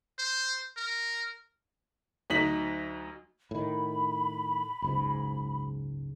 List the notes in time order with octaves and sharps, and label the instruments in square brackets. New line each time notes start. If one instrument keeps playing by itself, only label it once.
[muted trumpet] C5
A#4
[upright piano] D2 F#3 D#4 B6 F#7
[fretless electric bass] A2 D#3 [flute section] B5
[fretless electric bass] F#1 C#2 G#2